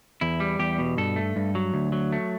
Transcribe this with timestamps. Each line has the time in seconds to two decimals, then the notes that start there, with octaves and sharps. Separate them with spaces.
0.21 E2 E4
0.40 G3
0.59 E2 G4
0.78 B2
0.97 G2 A4
1.16 A3
1.36 G2
1.55 F#3
1.74 D2
1.92 F#3
2.13 A3